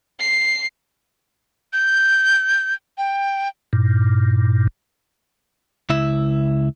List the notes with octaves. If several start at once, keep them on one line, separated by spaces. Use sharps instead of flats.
C7
G6
G5
G2 A#2
C#2 E4 E5